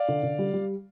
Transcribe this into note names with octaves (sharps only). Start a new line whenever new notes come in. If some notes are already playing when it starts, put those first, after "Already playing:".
Already playing: D5 F5
D3
D3
G3
G3